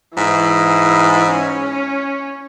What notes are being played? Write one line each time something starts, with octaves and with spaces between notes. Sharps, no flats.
G#2 E3
C#4